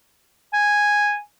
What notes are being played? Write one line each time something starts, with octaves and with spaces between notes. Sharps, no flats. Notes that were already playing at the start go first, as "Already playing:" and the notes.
G#5